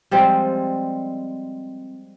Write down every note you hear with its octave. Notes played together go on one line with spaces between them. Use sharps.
F3 G3 G#3 C4